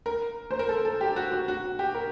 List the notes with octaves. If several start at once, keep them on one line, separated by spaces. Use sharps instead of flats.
A#4
C5
A#4
A4
A4
G4
F#4
F#4
F#4
G4
A#4